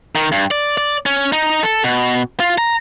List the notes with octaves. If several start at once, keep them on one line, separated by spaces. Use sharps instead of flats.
D#3
G2
D5
D5
C#4
D#4
A4
B2
F4
A#5